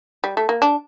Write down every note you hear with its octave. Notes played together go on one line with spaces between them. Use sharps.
G3
A3
A#3
D4